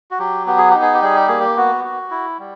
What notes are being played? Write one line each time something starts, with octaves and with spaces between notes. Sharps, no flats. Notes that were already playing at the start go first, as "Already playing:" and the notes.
F#4
F#3 G4
B3 G4
G#4
D#4 G4
G#4
G4
G3 G#4
G4
A#3 G#4
G4
B3 F#4
F#4
E4
G3